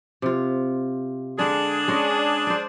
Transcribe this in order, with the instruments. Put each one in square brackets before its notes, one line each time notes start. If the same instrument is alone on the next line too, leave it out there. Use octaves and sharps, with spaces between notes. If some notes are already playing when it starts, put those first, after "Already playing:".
[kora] C3 F4
[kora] D3 G#3 [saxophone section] D4 G#4
[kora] G#3 C#4 D#5
C5 D5